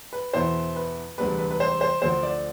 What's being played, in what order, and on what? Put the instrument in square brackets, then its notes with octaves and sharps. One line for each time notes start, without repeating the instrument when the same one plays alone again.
[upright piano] B4
E2 B2 B3 E4 C5
B4
E1 D2 C3 G3 D4 B4
B4
B4
C5
C5
D2 D3 F3 C5
D5